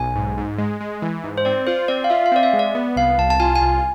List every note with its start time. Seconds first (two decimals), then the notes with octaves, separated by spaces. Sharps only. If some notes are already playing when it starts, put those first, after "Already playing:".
Already playing: B1 G#5
0.16 G#2
0.37 G#2
0.58 G#3
0.80 G#3
1.02 E3
1.24 G#2
1.38 C5
1.45 C4 D5
1.67 F4 C5
1.88 C4 D5
2.04 F5
2.10 F4 E5
2.26 F5
2.32 C4 D5
2.43 E5
2.53 G#3
2.59 D5
2.75 B3
2.96 C2 F5
3.18 C2 A5
3.30 A5
3.40 F4 G#5
3.56 G#5
3.61 C2